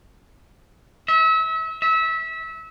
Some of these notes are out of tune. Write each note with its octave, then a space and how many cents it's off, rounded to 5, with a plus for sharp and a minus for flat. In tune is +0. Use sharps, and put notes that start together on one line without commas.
E5 -35
E5 -25